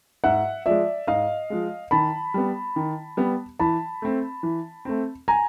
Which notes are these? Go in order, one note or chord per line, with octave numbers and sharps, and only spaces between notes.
G#2 E5 F#5
F3 G#3 D5 E5
G#2 D#5 F5
F3 G#3
D#3 A5 B5
G3 B3
D#3
G3 B3
E3 A5 B5
A3 C4
E3
A3 C4
G#5 A#5